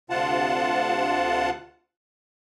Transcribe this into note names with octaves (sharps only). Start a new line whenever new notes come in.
D2 C3 F4 F#5 A5